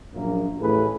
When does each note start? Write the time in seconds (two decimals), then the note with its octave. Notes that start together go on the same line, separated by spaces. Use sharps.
0.14 A#1 F#2 A#3
0.60 A1 A2 E3 G#4 A4 B4